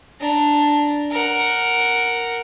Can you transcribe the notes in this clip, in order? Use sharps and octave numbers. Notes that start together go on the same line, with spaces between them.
D4 A#5
A#4 F#5